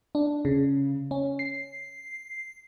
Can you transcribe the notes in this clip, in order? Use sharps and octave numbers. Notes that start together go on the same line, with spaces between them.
D4
C#3
C#4
C7